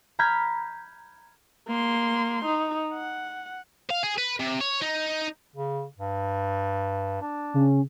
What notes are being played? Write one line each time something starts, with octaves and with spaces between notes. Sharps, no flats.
A#5 B5 F6 G6 G#6 B6
A#3 C6
D#4
F#5
F5
G#4
B4
C3
C#5
D#4
C#3
G2
D4
C#3 C#4